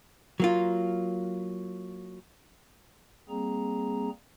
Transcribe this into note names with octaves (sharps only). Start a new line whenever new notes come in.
F#3 A#3 F4
G3 A#3 C4 G#4 A#5